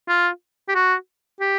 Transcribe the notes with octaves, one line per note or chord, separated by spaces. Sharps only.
F4
G4
F#4
G4